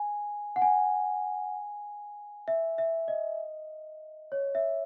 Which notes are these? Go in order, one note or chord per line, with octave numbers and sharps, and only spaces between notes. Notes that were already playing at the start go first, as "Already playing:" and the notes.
Already playing: G#5
F#5
G#5
E5
E5
D#5
C#5
E5